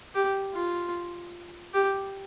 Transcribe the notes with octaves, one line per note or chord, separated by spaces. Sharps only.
G4
F4
G4